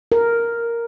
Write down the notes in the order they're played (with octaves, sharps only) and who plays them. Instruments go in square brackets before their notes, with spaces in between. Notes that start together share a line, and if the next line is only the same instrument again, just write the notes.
[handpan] A#4